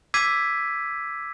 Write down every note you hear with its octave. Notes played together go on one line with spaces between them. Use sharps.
D6 E6 G#6 B6 C7 D#7